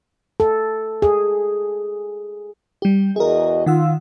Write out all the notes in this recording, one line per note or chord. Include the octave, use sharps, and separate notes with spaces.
A4
G#4
G3 G4
E2 F#4 G#4 A#4 D#5
D#3 F4 F#5 E6